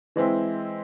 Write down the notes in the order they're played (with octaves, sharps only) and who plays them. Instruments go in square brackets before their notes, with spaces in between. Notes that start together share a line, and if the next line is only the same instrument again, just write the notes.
[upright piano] E3 G#3 C4 E4